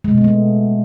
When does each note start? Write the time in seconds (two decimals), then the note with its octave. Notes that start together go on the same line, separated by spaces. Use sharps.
0.04 G#3
0.11 B2
0.18 B3
0.24 A3